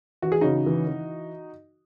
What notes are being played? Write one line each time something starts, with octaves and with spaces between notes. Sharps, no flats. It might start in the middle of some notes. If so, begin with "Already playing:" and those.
E3 F#4
G#4
C#3 D#4 F#4
E3
E3